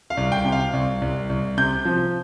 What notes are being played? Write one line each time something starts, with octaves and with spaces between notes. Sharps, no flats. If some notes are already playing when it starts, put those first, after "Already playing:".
F5
C2
G5
C3
F5
C2
C2
C2
C3 G6
F3